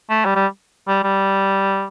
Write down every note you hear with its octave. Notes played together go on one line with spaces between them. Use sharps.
A3
G3
G3
G3
G3